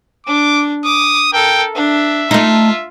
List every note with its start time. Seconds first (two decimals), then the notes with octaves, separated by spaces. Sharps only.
0.27 D4 D6
0.85 D6 D#6
1.33 A4 A#4 G5
1.75 D4 E5
2.31 A3 D#4 F4